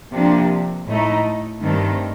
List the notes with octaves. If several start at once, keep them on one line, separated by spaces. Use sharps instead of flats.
C3 F3 A#3 D4
A2 A3 D#4
G2 D#3 A3 C4